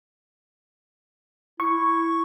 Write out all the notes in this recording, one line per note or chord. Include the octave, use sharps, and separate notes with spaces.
E4 C#6